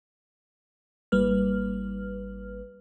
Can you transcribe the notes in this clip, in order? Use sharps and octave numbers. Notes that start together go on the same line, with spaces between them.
G#1 G3 A#3 B4 F6